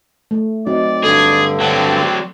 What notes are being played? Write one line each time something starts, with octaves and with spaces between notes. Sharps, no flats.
A3
F#3 C4 D#4 D5
G2 D3 G#4 A4
F#3 C4 D4